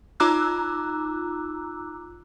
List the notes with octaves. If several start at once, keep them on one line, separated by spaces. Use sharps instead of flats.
D#4 F4 A#5 D6 E6 F#6